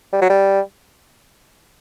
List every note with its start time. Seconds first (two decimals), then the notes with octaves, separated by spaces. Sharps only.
0.12 G3
0.21 F#3
0.29 G3